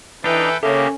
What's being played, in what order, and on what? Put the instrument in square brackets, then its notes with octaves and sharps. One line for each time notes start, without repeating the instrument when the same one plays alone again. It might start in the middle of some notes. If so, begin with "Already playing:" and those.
[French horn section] E3 [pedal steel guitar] D4 D#4 [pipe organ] A4 B4 G5
[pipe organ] C#3 A#3 [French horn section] C#4 [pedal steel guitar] G4 [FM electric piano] A4 E5